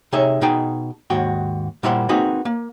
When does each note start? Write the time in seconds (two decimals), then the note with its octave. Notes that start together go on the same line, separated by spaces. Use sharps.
0.13 C3 D#4 G#4 C#5 E5
0.41 B2 D#4 G#4 G5 A5
1.10 D#2 G#2 F#4 G5
1.83 A#2 G3 E4 C5 F#5 B5
2.09 A#3 C4 D#4 F#4 G#4 B4
2.45 A#3